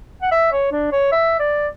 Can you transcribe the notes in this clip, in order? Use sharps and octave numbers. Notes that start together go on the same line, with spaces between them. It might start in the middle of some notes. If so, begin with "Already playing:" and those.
F#5
E5
C#5
D4
C#5
E5
D5